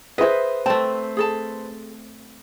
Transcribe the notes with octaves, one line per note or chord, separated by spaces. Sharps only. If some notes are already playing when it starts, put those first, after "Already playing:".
G#4 B4 C5 D#5 E5
A3 C4 A5
G#4 A4 A5